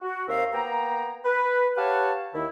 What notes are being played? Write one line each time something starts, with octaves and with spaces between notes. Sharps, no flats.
F#4
D#2 C4 A#4 C5 E5 F5
A#3 B3 G5 A#5
B4
G4 B4 C#5 F5 F#5 A5
D#2 D#3 E4